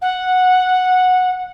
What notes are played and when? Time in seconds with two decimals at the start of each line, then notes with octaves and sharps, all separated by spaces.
0.01 F#5